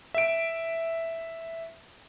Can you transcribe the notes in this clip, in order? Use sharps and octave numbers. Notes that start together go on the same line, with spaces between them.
E5 D7